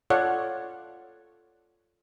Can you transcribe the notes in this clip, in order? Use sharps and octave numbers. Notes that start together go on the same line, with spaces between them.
F4 A4 C#5 D5 F5 F#5